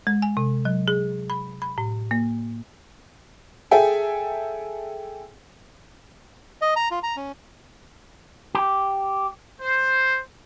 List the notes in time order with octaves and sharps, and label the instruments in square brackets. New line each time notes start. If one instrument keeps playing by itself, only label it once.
[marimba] G#3
G#5
C3
F#3
G#4
B5
B5
A2
A#3
[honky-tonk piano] G#4 A4 E5 G5 G#5
[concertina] D#5
A#5
F4
A#5
C#4
[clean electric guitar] G4
[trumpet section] C5